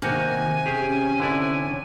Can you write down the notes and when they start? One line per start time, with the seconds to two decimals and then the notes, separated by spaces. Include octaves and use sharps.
0.02 C3 D#3 A#3 F#4 G#5
0.66 C#4 G4 G#4
1.20 D3 E4 D5